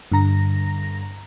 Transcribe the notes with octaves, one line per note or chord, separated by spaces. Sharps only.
G2 D3 A#5 A#6